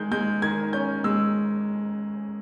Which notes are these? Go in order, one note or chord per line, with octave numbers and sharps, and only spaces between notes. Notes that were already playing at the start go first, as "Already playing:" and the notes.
Already playing: D#3 G#3 G6
G#3 G6
D#3 G#6
C#4 G6
G#3 E6